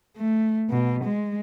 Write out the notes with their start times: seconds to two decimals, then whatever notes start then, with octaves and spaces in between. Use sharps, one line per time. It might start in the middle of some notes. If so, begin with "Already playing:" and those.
0.17 A3
0.70 B2
1.04 G#3